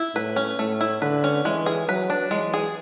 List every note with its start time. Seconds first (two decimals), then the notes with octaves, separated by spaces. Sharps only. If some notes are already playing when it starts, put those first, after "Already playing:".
Already playing: E4
0.15 A2 B4
0.36 C#4
0.59 A2 A3
0.81 E4
1.01 D3 B4
1.24 C#4
1.45 E3 G#3
1.66 G#4
1.88 F#3 B4
2.10 D4
2.31 E3 G#3
2.54 G#4